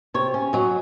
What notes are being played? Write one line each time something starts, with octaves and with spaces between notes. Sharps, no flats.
C3 C#5
C#4
F#3 D#5